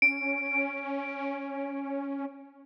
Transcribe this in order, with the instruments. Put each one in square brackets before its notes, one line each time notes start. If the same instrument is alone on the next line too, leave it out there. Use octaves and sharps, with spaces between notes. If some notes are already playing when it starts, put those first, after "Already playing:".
[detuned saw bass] C#4 [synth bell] D7